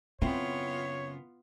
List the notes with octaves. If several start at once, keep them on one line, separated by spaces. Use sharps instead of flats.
F#2 C#3 B3 C4 E4 F4 C#5